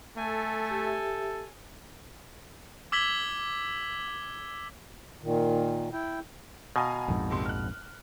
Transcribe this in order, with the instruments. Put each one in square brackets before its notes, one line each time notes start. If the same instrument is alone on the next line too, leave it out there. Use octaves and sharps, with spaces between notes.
[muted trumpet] A3 [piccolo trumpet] A4 [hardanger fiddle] G#5
[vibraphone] G4 E5
[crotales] D6 E6 G#6 B6 F#7 G7
[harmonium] A#2 D#3
E4 G5
[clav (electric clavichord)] B2 [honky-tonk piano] F5 G#5 A#5
[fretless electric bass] A#1 F2 G#2
[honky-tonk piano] F#1 C3 C6
F6 F#6